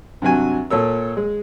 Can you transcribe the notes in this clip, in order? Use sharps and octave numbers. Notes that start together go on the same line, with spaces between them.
G2 C3 F#3 G#5
A#2 A4 C#5 E6
G#3